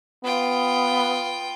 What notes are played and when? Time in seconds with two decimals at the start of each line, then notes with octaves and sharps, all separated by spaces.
0.24 B3 F4 G5